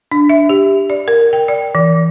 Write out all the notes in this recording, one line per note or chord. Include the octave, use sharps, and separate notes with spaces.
D4
E5
G4
D5
A#4
G5
D5
E3